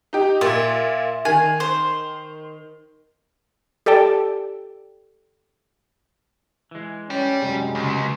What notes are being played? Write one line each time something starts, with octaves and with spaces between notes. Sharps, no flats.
D#4 G4
A#2 F4 E5
D#3 G#5
C5
G4 A4 D5 G5 A5
E3 G#3
C#4 D5 G5
F#2 C3 G#3
C#2